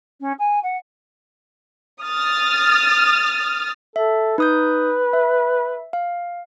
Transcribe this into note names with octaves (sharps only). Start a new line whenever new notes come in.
C#4
G#5
F#5
D#6 F6 A6
A4 E5
D#4 B4 D#6 G6
E5
F5